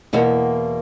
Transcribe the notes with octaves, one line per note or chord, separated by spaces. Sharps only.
E2 B2 A#3 F#4